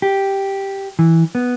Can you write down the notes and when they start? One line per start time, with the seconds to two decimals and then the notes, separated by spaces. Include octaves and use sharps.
0.02 G4
0.99 E3
1.35 B3